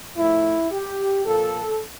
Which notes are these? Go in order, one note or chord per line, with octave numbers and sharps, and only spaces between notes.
A2 F3 A3 E4
G4
A#2 F3 A#3 A4